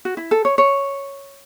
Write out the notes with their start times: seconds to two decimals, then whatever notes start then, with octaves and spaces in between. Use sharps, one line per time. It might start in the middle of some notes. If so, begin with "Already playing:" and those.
0.05 F#4
0.17 E4
0.31 A4
0.45 C#5
0.58 C#5